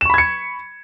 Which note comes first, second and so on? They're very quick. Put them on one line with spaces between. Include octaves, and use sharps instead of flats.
E7 C#6 B5 G#6 C#7